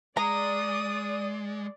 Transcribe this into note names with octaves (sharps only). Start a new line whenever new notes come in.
G#3 D5 A#5 D#6